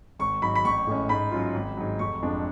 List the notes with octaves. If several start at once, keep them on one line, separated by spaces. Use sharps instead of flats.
G#1 C#6
G#2 F#3 B5
B5
A1 C#6
A2 G#3 C#4
G#2 B5
F#3 C#4 F4
G#1
G#2 F#3
F1 C#6
F2 F3 G#3 D4